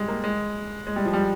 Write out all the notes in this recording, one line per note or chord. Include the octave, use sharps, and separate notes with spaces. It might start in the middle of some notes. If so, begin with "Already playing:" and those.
Already playing: G3 G#3
A#3
G#3
G#3
G3
F3
G3